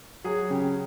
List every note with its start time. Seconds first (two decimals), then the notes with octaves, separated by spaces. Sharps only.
0.24 F#3 G#4
0.50 C#3 G4